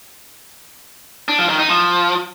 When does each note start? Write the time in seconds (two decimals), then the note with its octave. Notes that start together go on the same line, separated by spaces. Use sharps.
1.28 D4
1.39 F3
1.49 D#3
1.59 D#4
1.69 F3